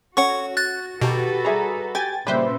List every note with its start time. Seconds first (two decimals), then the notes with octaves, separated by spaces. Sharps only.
0.17 C#4 F#4 A4 C#5 F#5 C#6
0.57 F#6 A6
1.02 B2 D#3 F#4 G4 A4 B4 A#5
1.45 G3 G#4 E5 A#5 B5
1.95 G4 G5 G#5 A6
2.27 A#2 C#3 E3 G3 G4 B4 C5 E5